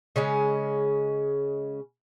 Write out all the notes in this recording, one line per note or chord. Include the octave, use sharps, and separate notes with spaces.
C#3 G#3 C#4